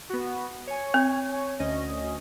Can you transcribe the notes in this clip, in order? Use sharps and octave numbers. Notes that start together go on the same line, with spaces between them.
B3 F#4
C#5 G#5
C4
D2 C#4 D#5